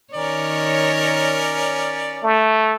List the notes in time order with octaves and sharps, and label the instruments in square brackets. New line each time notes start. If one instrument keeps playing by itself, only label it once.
[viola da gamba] D#3 C#5 [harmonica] C#4 A#4 D5
[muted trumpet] A3